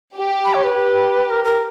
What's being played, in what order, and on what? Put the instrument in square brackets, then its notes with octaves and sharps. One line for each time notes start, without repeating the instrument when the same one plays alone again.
[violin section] G4
[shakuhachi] B5
C#5
B4
[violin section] G4
[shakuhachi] A#4
A#4